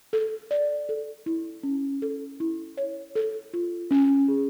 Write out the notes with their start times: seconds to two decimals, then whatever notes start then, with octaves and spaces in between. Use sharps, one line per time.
0.13 A4
0.51 D5
0.89 A4
1.26 E4
1.63 C#4
2.02 A4
2.40 E4
2.77 C#5
3.15 A4
3.54 F4
3.91 C#4
4.28 G#4